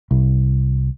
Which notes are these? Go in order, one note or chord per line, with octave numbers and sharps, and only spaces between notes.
C2